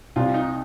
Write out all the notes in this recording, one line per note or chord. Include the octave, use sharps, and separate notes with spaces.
C2 F4
D#4